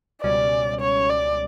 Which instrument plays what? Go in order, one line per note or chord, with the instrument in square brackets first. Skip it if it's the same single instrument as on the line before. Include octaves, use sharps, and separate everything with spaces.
[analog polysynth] C#2 B2 G3 C#4 [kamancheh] D5
[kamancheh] C#5
D5